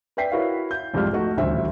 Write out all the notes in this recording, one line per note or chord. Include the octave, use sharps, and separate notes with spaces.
B4 D5 E5 G5 B6 C7
E4 F#4 A#4 B4 C#5 F5
G6
C2 F2 G#2 G3 F4 F6
A3 D#4 F#4
D#1 A1 D2 F#4 C5 E5